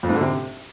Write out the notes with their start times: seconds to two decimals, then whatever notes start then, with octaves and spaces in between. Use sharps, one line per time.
0.03 F2
0.09 G#2
0.15 D3
0.21 C3